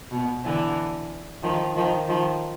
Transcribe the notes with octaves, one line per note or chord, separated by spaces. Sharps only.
B2
D3 E3
D#3 F3
D#3 F3
D#3 F3